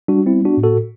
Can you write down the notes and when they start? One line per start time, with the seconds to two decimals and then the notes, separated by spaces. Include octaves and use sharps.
0.08 G3 D4 F#4
0.26 C4 E4
0.33 B3
0.45 D4 F#4
0.57 A2
0.63 F#4 A4